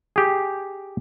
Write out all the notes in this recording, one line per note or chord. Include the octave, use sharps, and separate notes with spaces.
G4 G#4